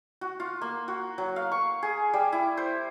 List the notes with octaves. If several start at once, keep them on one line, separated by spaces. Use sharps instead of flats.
F#4
F4
A#3
F#4
F#3
F5
C#6
G#4
G3
E4
C5